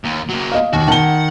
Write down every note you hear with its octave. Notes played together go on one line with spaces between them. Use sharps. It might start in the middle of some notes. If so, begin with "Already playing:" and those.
D#2
F#3 A#3
D#5 F5
D#2 F#4
D#3 F#5 A5 G7